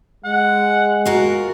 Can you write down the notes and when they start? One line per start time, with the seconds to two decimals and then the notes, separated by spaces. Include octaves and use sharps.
0.24 G#3 F#5
1.06 F4 F#4 A#4